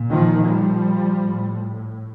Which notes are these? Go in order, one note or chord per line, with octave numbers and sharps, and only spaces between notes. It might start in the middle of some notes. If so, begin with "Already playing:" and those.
Already playing: A#2
D#3 F3
F3 G3
A2